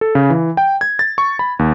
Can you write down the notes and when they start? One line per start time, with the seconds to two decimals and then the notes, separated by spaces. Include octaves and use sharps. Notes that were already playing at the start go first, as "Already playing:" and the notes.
0.01 A4
0.15 C#3
0.30 E3
0.57 G5
0.81 G#6
0.99 A6
1.18 C#6
1.39 B5
1.59 D#2